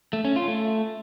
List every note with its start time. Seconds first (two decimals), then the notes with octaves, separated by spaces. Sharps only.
0.13 A3
0.25 C#4
0.36 F4
0.48 A3